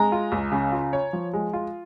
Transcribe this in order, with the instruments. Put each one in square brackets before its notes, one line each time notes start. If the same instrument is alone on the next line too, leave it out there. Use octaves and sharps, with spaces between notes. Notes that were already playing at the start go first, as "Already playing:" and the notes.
Already playing: [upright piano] G#3 [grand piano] A#5
[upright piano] F4
C#2
C#3
F4
C#5
F3
G#3
F4